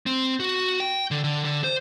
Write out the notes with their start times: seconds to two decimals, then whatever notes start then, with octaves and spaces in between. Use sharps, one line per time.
0.06 C4
0.40 F#4
0.80 G5
1.11 D3
1.24 D3
1.45 D3
1.64 C5